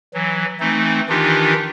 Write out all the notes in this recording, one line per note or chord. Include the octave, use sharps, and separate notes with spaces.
E3 F#3
E3 A3 C4 D#4
D#3 E3 D4 D#4 F4 G4